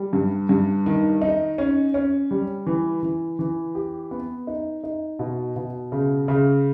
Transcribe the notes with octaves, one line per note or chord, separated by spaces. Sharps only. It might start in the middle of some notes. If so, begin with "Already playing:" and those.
Already playing: G3
G2
G2
D#3
D#4
C#4
C#4
G3
E3
E3
E3
G4
B3
D#4
D#4
B2
B2
C#3
C#3